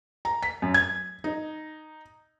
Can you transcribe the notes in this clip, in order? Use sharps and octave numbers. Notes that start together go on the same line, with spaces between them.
A#5
B6
F#2
G#6
D#4